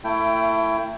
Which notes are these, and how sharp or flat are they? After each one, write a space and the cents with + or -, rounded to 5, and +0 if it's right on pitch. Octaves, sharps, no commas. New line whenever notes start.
A3 +35 E4 +20 G5 +0